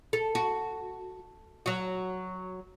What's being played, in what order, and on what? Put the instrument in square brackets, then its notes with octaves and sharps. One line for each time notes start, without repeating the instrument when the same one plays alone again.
[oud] A4
F#4
F#3 F#4